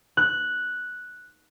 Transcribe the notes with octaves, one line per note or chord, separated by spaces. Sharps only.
F#6